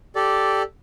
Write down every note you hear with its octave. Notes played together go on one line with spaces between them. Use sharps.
G4 A4 D5 D6